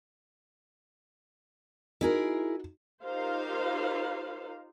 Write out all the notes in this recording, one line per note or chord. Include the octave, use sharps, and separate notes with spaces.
D#4 E4 F#4 G#4 A#4
D#4 F4 G4 A#4 C5 F5